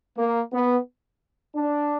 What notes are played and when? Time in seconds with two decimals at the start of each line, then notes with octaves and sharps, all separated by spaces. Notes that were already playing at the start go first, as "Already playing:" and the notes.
0.17 A#3
0.53 B3
1.56 D4